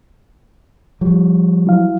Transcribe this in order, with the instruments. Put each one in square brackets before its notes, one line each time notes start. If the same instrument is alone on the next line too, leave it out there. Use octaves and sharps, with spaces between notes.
[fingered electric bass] F3 G3
[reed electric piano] F#3 E4 F5